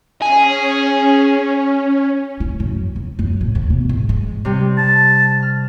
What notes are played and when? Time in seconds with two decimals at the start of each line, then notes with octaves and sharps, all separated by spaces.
0.22 C#4 G#4
2.40 E4
2.60 F#2
2.96 D#2
3.19 F#2
3.41 A2
3.55 D#2
3.70 B2
3.89 G#1
4.09 G#3
4.45 C3 G3
4.78 A5
5.42 F6